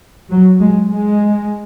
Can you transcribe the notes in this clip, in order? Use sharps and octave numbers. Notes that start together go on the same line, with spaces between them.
F#3
G#3
G#3